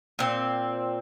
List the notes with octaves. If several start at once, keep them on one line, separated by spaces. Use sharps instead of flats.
A#2 C4